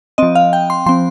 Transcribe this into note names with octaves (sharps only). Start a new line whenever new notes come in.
F3 C4 D#5
F5
G5
C6
F3 C4 C6